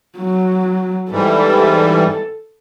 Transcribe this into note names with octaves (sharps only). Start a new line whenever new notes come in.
F#3
G#2 E3 G3 A4